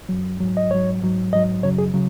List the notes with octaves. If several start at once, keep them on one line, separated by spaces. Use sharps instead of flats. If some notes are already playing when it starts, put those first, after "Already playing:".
F#2 F#3
G#2 F#3
D#5
G#2 F#3 C#5
G#2 F#3
G#2 F#3 D#5
F#2 C#3 F#3 C#5
G#4
C#3 F#3